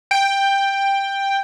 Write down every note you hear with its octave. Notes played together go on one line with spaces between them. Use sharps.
G5